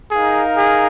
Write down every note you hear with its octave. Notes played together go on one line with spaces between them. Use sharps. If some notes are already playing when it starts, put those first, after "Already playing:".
D#4 G#4 A#4 F5
G#4